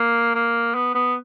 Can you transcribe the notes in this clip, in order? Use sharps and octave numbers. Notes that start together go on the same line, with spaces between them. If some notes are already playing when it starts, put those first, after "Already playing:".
Already playing: A#3
A#3
B3
B3